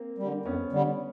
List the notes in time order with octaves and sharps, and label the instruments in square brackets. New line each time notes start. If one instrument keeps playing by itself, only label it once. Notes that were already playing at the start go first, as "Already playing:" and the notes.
Already playing: [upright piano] A#3 C4
[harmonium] D3 G3
[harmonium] F2 [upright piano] B3 C#4
[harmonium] D3 G3